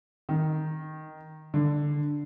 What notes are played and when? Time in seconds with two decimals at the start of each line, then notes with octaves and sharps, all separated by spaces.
0.29 D#3
1.54 D3